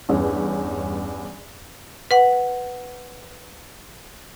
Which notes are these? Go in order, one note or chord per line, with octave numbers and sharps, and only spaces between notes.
E2 G2 C#4
B4 F#5